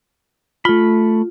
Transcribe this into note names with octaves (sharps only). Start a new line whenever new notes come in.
A3 F4 B5